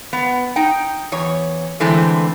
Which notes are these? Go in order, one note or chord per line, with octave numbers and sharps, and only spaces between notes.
B3
D#4 G5
E2 C#5
D3 E3 G#3 A3 C4